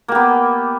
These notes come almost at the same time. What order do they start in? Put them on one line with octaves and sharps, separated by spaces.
A#3 G4 B3